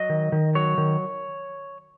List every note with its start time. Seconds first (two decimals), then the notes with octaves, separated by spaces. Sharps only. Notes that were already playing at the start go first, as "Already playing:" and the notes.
Already playing: F#3 D#5
0.10 D#3
0.32 D#3
0.55 F#3 C#5
0.78 D#3